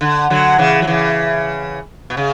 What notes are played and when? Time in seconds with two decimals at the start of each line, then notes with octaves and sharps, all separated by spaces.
0.01 D3
0.30 D3 F#3
0.58 C#3 E3
0.82 F#3
0.87 C#3 E3
2.10 B2
2.17 C#3